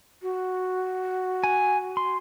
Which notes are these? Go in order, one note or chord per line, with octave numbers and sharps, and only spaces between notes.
F#4
G#5
C6